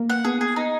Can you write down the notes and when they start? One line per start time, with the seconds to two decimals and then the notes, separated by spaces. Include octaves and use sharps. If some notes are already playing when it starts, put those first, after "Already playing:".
Already playing: A#3
0.10 F#5
0.25 B3 G#4
0.41 G#4
0.56 D#4